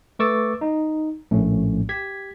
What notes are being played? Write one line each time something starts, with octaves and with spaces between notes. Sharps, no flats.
A3 B4 C#6 D6 E6 A6
D#4
A#1 A2 A3 C#4
G4 G#6 B6